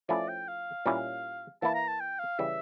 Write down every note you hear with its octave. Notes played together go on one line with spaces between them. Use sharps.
F3 A3 C#4 E4 D5
G5
F5
A#2 G3 C#4 E4
E3 A#3 E4 A5
A#5
A5
G5
F5
C#3 E3 G3 E5